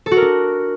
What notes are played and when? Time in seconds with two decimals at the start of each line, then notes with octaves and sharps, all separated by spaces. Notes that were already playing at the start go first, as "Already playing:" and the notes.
0.06 A4
0.11 F#4
0.17 A#4
0.22 D4